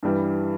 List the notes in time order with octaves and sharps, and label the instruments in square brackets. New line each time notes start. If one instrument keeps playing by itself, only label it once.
[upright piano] G2 E3 G3